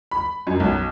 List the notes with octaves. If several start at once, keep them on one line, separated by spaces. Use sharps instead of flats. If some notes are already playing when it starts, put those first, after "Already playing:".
B5
F#2
B1